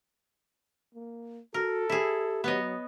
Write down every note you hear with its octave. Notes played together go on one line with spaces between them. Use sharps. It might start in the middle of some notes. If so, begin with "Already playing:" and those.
A#3
F#4 A4 A#4
E4 G4 G#4
F#3 B3 C#5 D#5